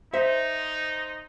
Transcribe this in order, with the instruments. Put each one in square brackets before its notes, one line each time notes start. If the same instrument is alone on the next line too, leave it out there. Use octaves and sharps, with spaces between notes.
[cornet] D#4 [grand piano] C5 [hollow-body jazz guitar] E5